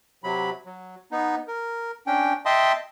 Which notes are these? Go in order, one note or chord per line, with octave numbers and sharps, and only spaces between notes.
C3 F#3 B5
F#3
B3 D#4
A#4
C#4 D4 G5
D#5 E5 G5 A5 C6 D#6